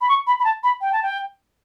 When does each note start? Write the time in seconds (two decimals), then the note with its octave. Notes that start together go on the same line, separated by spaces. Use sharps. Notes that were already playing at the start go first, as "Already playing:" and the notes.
0.01 B5
0.09 C#6
0.27 B5
0.40 B5
0.44 A5
0.63 B5
0.81 G5
0.93 A5
1.03 G5